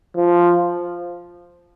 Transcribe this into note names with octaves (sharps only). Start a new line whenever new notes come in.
F3